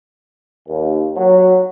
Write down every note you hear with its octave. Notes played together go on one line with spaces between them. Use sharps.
D#2
F#3